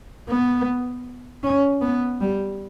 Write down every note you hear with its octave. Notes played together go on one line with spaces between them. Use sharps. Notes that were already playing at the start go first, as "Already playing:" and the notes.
B3
C#4
B3
G3